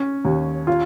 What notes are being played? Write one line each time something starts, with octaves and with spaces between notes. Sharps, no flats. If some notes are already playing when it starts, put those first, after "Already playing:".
Already playing: C#4
D#2
F4